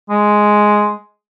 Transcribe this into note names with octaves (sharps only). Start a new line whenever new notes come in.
G#3